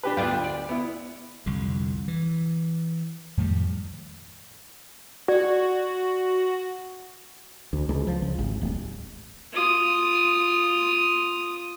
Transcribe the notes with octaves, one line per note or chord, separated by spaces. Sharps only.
D4 G4 B4
D2 B3 D4 F4 G5
D5
B3 E4
C2 F2 D3
E3
F2 A2 D#3 G3
F#4 D5
D2
C#2
F3
C#2
G#1
D1
F4 D#6